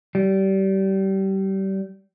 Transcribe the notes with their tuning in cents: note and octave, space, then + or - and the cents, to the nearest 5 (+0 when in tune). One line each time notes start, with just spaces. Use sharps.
G3 -25